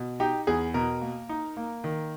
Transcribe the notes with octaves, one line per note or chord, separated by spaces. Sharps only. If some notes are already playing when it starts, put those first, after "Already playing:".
Already playing: B2
D#4 G4
E2 G#4
B2 A#4
A#3
D#4
A#3
D#3